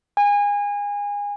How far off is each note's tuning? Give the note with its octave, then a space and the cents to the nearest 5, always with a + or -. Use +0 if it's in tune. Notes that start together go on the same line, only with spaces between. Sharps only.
G#5 -25